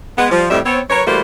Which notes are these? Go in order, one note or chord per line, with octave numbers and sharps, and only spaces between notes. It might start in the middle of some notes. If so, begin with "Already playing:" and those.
G#3 B3
F3 G3
F2 A2 G3 C4 D#5 E5
B3 C4 C#5
F#3 A#4 B4 C#5
E3 G3 A3 A#3 F#4 C5